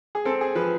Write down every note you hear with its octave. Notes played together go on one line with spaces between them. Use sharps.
G#4
C4 A4
G#4
F3 B4